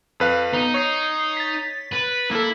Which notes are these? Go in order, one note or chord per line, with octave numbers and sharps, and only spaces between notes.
F2 B4 F5
B3 D#4
C#5 C#6 D#6 C7
A6 B6
B4
A#3 E4 A4